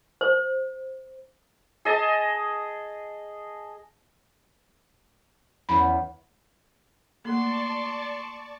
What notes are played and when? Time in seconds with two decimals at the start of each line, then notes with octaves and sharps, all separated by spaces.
0.21 C5
1.85 G#4 D#5 A5
5.69 E2 C#4 B5
7.25 A3 A#3 D5 A5 C6 C#6